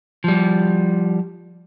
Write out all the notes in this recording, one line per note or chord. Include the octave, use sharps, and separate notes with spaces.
F3 G3